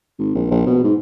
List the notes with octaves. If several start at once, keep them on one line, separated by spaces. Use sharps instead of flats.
G#1
A#1
A#1
B2
G#2